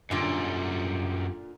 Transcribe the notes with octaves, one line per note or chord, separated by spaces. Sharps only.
F#2 A#2 D3 G3